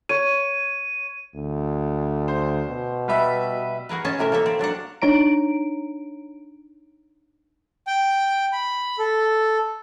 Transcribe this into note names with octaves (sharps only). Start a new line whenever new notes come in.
C#5 D#7
D2
C5
B2
G3 B4 E5
F#4 G#4 A#4 B4
C#4 D#5 G#5 A5
A2 C3 A#4 E5
A#3 A4 C#5 E5
C4
F#3 D4 F5 F#5
D4 D#4 C#5 A#5 D7
G5
B5
A4